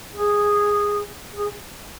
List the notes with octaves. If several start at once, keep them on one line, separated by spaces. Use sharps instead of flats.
G#4
G#4